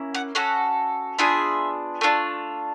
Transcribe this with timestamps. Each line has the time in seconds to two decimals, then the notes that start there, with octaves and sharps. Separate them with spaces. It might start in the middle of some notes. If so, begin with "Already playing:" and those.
Already playing: A#3 C#4 E4
0.14 F#5
0.35 C#4 F#4 A4 F#5
1.18 B3 D4 F4 G#4 E5
2.01 A3 D4 F4